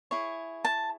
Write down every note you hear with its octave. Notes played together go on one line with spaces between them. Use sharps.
E4 G#4 C#5
A5